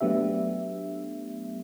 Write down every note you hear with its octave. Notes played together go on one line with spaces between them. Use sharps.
F#3 A3 B3 D4 G4 E5